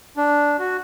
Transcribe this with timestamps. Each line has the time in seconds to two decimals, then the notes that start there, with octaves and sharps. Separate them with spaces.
0.17 D4
0.59 F#4